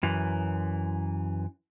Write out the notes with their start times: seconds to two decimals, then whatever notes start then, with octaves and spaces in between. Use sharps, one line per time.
0.03 F#2 E3